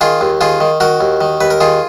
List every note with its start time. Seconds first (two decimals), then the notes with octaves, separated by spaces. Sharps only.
0.01 D#3 F4 G#4
0.21 D#2
0.41 D#3 F4 G#4
0.60 D#3
0.80 D#3 F#4 A#4
1.01 D#2
1.21 D#3
1.41 D#2 B4
1.50 A#4
1.60 D#3 F4 G#4